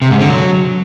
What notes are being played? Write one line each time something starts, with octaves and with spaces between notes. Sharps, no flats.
C3
G#2
D3
F#3